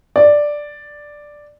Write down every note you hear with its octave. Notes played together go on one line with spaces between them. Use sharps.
D5